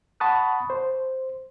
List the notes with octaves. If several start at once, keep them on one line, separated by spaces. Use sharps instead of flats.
F#5 A5 B5 C#6 D#6 F#6
C5